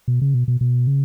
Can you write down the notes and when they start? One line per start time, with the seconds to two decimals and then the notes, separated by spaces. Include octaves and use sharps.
0.08 B2
0.21 C#3
0.34 B2
0.48 B2
0.61 B2
0.87 C#3